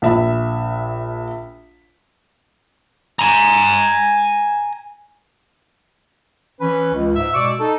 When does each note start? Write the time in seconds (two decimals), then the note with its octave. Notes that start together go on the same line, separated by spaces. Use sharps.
0.02 A#1 E5 B5
3.19 G#5 A#5
6.61 E3 C#4 B4
6.93 C#2
7.16 G#2 E5
7.33 B2 G#3 D5 C#6 D6 E6
7.59 D#4 A4